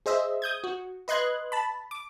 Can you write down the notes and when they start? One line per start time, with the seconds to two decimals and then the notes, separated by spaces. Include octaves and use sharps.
0.06 G#4 C5 D#5 E5
0.42 D#6 G6 G#6
0.64 F#4
1.08 B4 D#5 C6 F#6 G#6
1.52 A5 B5
1.91 D6